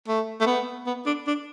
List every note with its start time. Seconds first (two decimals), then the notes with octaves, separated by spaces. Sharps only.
0.08 A3
0.41 A3
0.47 B3
0.87 B3
1.06 D4
1.27 D4